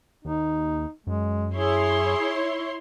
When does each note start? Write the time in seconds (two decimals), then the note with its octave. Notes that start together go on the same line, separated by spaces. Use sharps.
0.25 D#2 D#4
1.07 F#2 G#3
1.55 E4 G#4 C#5 C6